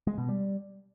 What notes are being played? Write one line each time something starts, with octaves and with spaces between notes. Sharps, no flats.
G#3
B2
G3